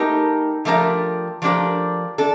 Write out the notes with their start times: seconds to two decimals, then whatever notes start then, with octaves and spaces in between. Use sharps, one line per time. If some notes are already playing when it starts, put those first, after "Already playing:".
Already playing: A3 D#4 G4 A#4
0.65 F3 A3 D4 G4 A#4
1.42 F3 A3 D4 G4 A#4
2.18 D4 A4